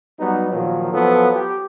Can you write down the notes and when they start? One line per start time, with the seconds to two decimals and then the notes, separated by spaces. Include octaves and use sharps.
0.19 F#3 G3 B3 D#4
0.50 A#2 D#3 F3 F#3
0.92 F3 F#3 B3 A4
1.33 G4